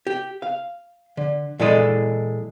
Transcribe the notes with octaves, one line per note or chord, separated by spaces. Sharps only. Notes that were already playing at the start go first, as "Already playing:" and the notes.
G4
F5
D3
A#2 E3 G#3 A4 D5 D#5